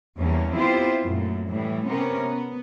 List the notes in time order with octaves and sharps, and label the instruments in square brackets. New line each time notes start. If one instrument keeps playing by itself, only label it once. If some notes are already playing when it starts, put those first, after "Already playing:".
[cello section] E2 G3 A#3 C#4
B3 C4 E4 F4 G4 C5
F#2 A#2 A3
A2 E3 G3
C3 B3 C#4 A#4
B3